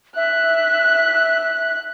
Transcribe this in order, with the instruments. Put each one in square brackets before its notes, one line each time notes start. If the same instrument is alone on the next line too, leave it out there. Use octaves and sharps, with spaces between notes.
[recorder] E5 [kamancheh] F#6